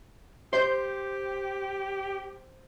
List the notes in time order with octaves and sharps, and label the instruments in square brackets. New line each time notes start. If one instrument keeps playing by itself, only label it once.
[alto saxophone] G4 [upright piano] C5 [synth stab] C6 G6